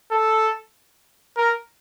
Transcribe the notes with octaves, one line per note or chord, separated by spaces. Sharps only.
A4
A#4